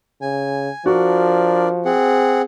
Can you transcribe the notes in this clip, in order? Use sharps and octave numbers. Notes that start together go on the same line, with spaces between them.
C#3 G#5
F3 D4 F#4 A#4 D5
C4 G#4 F#5